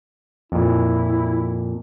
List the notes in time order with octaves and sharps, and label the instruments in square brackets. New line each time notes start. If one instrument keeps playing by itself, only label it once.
[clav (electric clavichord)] F2 A#2 [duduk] E4